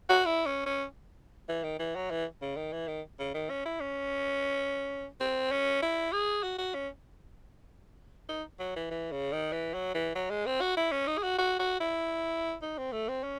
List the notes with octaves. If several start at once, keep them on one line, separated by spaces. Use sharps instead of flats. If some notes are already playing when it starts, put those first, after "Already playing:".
F#4
E4
C#4
C#4
E3
D#3
E3
F#3
E3
C#3
D#3
E3
D#3
C#3
D#3
C#4
E4
C#4
C4
C#4
E4
G#4
F#4
F#4
C#4
D#4
F#3
E3
E3
C#3
D#3
E3
F#3
E3
F#3
G#3
C4
F#4
E4
C#4
D#4
G#4
F#4
F#4
F#4
E4
D#4
C4
A3
C4
C#4